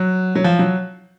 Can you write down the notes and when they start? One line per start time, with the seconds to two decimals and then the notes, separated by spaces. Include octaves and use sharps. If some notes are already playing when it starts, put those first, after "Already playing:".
Already playing: F#3
0.35 F#3
0.44 F3
0.59 F#3